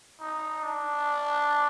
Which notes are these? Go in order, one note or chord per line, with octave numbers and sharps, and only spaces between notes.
D#4
D4